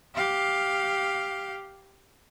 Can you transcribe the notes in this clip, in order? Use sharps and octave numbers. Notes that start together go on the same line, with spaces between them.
G4 F5